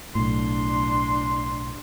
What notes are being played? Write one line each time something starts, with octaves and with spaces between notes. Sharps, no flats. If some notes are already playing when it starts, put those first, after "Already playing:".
B1 A2 D4 C6